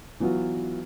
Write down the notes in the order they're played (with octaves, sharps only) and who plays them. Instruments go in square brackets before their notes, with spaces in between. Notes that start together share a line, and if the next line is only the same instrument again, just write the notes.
[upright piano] E3 F#3 B3 F4 F#4